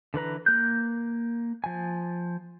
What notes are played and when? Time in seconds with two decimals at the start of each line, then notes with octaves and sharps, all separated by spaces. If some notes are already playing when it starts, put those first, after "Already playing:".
0.14 D3 E3 B4 A#5
0.46 A#3 F#6 G6
1.64 F3 G#5